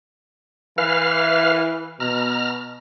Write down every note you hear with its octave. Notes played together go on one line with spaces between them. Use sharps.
E3 B4 F5 F6
B2 A#5 F6